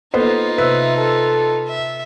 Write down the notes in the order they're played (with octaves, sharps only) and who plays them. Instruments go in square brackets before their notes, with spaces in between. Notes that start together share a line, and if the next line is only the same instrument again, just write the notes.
[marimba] A#3 A4 [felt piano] B3 B4 C5 [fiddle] D#4 F4
[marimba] C3 C5 E6 [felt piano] B4 [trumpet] E5
[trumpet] A4
[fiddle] E5